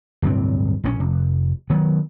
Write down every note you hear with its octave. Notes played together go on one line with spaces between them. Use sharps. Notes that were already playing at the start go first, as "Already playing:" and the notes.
D1 G2 C3 C4
A#1 G#3 C#4
F1
D#3 F#3 B3